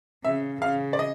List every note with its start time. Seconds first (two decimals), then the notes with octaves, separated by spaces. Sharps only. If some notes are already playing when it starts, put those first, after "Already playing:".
0.24 C#3 E5
0.62 C#3 F5
0.93 D5
0.99 D#5